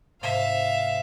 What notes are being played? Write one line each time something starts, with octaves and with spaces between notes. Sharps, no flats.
G#2 C3 E5 F5